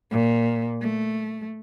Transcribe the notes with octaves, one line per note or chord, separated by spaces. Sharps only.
A#2
A3